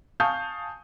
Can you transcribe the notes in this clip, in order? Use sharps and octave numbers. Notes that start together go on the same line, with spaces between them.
F5 G#5 A5 C#6 D#6 G6